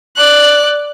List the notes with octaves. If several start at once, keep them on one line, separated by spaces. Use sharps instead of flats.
D5 F#6